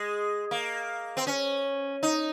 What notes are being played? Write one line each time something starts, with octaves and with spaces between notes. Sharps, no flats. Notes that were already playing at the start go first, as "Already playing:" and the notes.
Already playing: G#3
A#3
C4
C#4
D#4